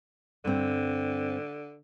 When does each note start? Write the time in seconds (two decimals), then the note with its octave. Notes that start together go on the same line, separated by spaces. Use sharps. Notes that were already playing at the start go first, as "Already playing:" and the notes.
0.45 G2 D3 C4